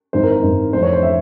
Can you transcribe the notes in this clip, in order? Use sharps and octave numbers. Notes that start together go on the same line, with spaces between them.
G#1 G#2 E3 C5
A#4
C5
G#1 G#2 E3
F1 F2 E3 C5
C#5
C5
E5